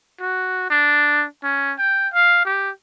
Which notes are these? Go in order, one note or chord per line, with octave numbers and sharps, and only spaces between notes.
F#4
D4
C#4
G5
F5
G4